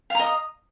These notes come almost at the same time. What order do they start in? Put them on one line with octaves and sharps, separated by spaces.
F5 A#5 D#5 D#6